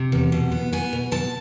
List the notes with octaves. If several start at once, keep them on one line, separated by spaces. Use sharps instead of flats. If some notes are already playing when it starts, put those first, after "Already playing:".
Already playing: C3
E2
B2
B3
B3 G#5
B2
B2 A5